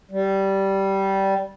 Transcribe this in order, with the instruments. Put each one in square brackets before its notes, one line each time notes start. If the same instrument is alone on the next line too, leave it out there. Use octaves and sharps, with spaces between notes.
[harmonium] G3